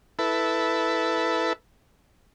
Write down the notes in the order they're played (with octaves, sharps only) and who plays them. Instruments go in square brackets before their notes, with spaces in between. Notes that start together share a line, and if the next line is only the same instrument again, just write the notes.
[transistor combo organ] E4 A4 B4